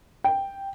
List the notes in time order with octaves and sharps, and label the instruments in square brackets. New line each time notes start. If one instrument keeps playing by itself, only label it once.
[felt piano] G5